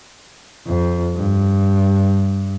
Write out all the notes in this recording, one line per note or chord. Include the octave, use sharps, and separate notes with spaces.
F2
G2